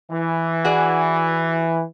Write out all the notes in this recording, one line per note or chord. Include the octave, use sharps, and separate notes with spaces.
E3
F#4 G#4 D5